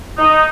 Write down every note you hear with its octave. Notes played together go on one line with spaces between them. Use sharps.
D#4